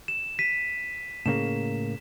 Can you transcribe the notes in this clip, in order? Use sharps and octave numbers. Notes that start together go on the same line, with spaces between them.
E7
B6 D#7
A2 C#3 A#3 E7